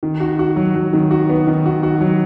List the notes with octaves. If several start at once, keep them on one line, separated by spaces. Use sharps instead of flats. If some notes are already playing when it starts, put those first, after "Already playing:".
D#3
F#4
F#4
F#3
F#3
D#3
F#4
B3
D#3
F#4
F#4
F#3